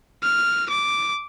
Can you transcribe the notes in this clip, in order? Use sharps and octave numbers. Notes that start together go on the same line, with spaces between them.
F6
D6